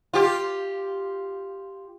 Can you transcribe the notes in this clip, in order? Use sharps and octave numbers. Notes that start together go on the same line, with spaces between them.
F4 G4